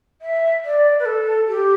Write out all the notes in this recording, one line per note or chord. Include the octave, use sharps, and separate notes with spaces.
E5
D5
B4
A4
G4